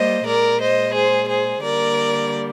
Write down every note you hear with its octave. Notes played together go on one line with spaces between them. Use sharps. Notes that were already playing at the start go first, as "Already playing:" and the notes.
Already playing: G3 A#3 C5 D#5
A#2 G#3 A#4 D5
C5 D#5
G#4 C5
G#4 C5
D3 G3 A#3 A#4 D5